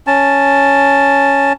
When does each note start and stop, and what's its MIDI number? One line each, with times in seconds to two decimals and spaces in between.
0.07 1.53 61
0.07 1.53 81